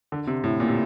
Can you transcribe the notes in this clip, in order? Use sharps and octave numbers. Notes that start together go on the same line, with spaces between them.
D3
C3
A2
A#2
C3